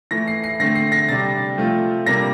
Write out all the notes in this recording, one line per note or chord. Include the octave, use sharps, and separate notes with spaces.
E3 A3 E4 A#6
C7
C7
D3 A3 C4 A#6
C7
A#6
C3 G3 D4 A6
F3 A3 C4 F4
C3 G3 A#3 D4 A#6